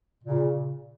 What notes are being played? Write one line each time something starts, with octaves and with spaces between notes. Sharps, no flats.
A#2 C#3